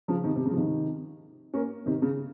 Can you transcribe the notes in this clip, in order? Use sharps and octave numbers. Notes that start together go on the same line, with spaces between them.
C#3 F3
C3 D#3
C3
C#3
F3
C3 D#3
A#3 C#4
C3 D#3
C#3